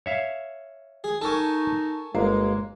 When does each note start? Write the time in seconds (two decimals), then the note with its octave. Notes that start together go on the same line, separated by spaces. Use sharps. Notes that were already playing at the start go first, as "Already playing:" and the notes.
0.06 C#5 E5 F5
1.04 G#4
1.21 D#4 A4 A#4 G#5 A5 C#6
2.15 G1 G#3 A#3